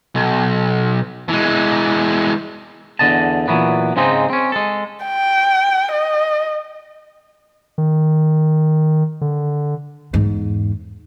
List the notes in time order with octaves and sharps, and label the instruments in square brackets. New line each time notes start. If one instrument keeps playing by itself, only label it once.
[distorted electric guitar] B1
E3 G#3
[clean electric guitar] E2 G#2 D3 D#5 A5
A#2 E3 F#3 B3
G#2 C#3 G#3 C4 D#4
C4 C#4
G#3 A4
[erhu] G5
D#5
[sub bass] D#3
D3
[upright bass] E2 G#2